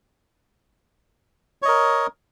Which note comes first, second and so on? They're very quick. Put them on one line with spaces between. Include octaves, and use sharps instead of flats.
C#5 D#5 A#4